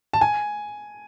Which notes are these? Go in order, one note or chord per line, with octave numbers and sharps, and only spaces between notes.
A5
G#5